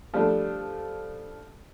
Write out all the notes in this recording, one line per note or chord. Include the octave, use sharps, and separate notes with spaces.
F3 G3 A3 D4